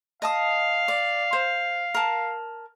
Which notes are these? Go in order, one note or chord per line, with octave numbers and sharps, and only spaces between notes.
D#5 F5 A5 D#6
D5
C5
A#4 A5